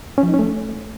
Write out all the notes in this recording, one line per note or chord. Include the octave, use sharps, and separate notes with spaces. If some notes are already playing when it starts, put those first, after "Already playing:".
C#4
F3
D#4
C#4
A3